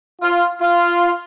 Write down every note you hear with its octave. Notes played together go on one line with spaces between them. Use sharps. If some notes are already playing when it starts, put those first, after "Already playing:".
F4
F4